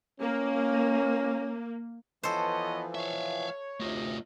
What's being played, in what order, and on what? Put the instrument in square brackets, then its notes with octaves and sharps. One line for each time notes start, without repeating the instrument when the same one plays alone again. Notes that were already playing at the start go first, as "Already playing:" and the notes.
[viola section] A#3 [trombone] C#4
[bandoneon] E3 F3 [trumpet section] B3 C#5 D#5 [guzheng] A4 C5
[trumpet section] C#5 [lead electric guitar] E5 F5
[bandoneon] D2 C3 D#5 [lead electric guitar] A3 F4